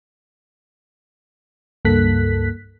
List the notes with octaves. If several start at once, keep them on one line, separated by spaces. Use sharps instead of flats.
C#2 G2 A#3 A4 F#6 B6